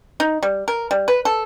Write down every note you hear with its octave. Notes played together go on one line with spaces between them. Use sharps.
D#4
G3
A#4
G3
B4
A4